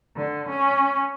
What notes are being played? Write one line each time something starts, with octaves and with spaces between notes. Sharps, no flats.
D3
C#4